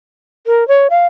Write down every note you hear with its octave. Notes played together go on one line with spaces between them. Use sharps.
A#4
C#5
F5